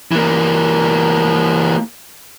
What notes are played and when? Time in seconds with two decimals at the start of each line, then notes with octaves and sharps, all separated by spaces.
0.11 E3 A#3